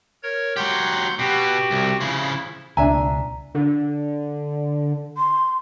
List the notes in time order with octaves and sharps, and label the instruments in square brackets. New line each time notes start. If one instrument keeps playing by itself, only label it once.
[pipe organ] A#4 C#5 G#6
[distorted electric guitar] F#3 G4 [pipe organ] F#5 C6 G6
[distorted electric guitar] B2 [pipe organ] F#4 G4 G5
[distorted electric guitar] C2
[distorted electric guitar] C#3 F3 [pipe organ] E4
[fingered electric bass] C#2 B2 [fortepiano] D4 E5 G#5 [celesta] A#5
[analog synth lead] D3
[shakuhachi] C6